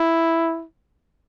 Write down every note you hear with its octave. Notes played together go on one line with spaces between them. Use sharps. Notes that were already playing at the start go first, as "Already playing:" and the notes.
Already playing: E4